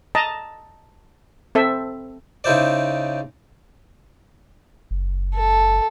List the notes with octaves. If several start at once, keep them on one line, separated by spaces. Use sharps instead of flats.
D#5 A5 A#5
C4 A4 E5
C#3 D#4 E4 C5 D5
F#1
A4